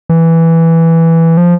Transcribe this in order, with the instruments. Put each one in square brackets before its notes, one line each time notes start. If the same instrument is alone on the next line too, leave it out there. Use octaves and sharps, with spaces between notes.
[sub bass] E3
F3